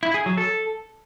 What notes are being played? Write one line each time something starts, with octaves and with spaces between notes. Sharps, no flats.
E4
G#4
F#3
A4